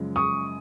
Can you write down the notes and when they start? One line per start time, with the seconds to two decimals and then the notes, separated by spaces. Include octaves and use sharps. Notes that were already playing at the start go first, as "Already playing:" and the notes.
Already playing: F#2 C#3 F3 G#3
0.16 C#6 D#6